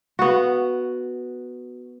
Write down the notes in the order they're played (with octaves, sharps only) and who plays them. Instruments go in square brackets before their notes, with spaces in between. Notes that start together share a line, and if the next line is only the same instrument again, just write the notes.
[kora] B3 F#4